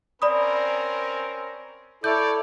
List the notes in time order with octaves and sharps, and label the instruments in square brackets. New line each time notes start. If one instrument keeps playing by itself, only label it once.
[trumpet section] C4 C#4 A#4 [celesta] D5 B5 D#6
[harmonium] E4 A4 [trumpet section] C#5 D5 [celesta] G6